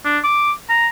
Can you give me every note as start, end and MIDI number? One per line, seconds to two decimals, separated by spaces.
0.05 0.18 62
0.24 0.52 86
0.69 0.88 82